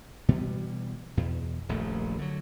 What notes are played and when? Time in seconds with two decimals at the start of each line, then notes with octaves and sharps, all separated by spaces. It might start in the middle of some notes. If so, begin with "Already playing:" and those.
0.28 B2 E3 G3 B3
1.17 E2 B2
1.69 D#1 A#1 F#2 A3
2.18 D3 F#3